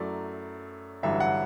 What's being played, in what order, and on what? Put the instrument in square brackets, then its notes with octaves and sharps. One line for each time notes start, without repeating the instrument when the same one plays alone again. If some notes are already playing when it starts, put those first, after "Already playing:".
Already playing: [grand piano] F#2 F#3 A3 E4 D5
A1 G2 D3 F#3 E5
F#5